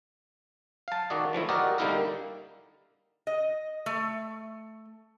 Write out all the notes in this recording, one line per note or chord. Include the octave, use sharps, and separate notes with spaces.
F5 A5
D#3 F#4 D5 D#5
E3 F3 A3 E4
F#4 G4 A#4 D5 D#5 F#5
D3 G3 A#3 D#4 E4 A#4
D#5
A3